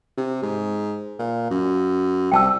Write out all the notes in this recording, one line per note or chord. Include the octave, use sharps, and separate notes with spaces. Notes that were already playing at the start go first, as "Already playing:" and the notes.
C3
G#2
A#2
F#2
C2 G5 A5 E6